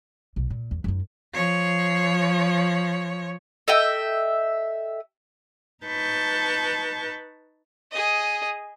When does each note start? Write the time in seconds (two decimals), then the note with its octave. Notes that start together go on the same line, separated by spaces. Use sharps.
0.36 B1
0.50 A#2
0.71 E2
0.84 F#2 D#4
1.33 F3 C#5
3.68 A4 D#5 E5 G5
5.85 D#4 B4 A5 C#6 G6
7.91 G#4 D#5